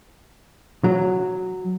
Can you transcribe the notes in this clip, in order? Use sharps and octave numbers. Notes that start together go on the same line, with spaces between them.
F#3